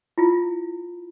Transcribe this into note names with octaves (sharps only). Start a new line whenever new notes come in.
E4 F4